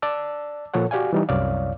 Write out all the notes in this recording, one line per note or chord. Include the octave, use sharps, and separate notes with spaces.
D5 A5 E6
A#2 F3 A4 C#5 F#5
F#4 G4 D5 F5 G#5
E3 G3 D#4
C2 F#2 C#5 D5 F5